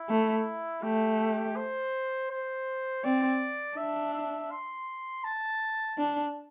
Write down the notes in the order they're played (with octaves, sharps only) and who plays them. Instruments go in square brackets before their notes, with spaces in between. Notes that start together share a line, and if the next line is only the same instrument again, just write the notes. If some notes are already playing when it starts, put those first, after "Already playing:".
Already playing: [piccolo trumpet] E4
[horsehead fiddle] A3
[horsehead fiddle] A3 [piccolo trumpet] G4
[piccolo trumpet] C5
C5
[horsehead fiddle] C4 [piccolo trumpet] D5
[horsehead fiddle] D4 [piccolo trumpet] E5
[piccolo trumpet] E5
C6
A5
[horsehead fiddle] D4